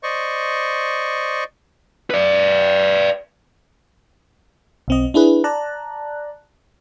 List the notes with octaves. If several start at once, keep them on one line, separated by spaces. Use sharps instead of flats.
C5 D5 D#5 C#6
B4 D5
B1 C4 D#5
D4 E4 G#4 B4
D5 A5 A#5 F#6